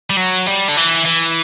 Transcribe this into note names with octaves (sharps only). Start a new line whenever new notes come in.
G3
F#3
G3
D3
E3
E3